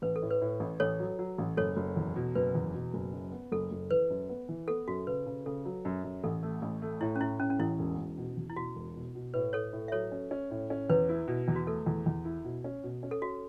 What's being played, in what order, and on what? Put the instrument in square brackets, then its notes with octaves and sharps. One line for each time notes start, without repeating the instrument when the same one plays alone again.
[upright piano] A1 [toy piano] B4
[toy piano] A4
[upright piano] A2
[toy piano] B4
[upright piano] A2
A1
[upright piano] A1 [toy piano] A4 C#5
[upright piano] F#3
F#3
A1
[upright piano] F#1 [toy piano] A4 C#5
[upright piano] F#1
E2
B2
[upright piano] F#1 [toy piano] B4
[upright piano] E2
B2
F#1
F#2
B3
[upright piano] F#1 [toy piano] A4
[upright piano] F#1
[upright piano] E3 [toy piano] B4
[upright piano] F#2
B3
E3
[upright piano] B3 [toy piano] A4
[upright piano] F#2 [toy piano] F#4
[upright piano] C#3 [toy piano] B4
[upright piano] C#3
[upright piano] C#3 [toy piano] A4
[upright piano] F#3
F#2
F#2
[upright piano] A1 [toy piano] A4
[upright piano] A3
A1
A3
[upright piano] A2 [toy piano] E4
[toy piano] C#4
[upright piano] A2 [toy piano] E4
[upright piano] A2 [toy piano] C#4
[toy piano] C#4
[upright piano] A1 [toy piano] E4
[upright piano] E1
E1
B2
E2
[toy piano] E4
[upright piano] B2 [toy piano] F#4
[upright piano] E1
B2
B2
[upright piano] A2 [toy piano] B4
[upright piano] A2 [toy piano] A4 C#5
[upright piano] A2
[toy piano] E5
[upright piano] F#3 [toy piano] A4 C#5
[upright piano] C#4
C#4
A2
C#4
[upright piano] E2 [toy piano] B4
[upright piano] E4
B2
E2
[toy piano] F#4
[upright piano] A3 [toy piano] A4
[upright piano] E2
E2
E4
B2
C#4
B2
C#4
[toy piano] A4
[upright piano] C#4 [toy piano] F#4